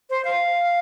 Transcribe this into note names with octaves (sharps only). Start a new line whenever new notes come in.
C5
F5